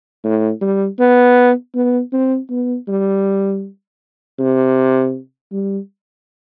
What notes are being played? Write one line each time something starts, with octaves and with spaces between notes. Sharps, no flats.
A2
G3
B3
B3
C4
B3
G3
C3
G3